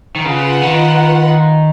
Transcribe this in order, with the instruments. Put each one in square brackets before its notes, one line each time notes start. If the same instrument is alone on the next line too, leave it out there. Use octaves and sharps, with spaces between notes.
[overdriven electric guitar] D#3
[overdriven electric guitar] C#3 [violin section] F4 B4 F#5
[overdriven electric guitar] D#3